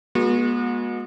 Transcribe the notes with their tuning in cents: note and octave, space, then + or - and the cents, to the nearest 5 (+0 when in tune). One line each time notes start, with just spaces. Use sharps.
G#3 +0 B3 -45 F#4 -30